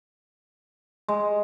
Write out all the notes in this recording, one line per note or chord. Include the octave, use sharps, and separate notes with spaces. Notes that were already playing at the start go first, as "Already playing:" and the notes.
G#3